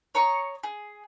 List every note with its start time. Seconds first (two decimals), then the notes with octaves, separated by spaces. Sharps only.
0.15 C#5 A#5 C#6 D#6
0.63 G#4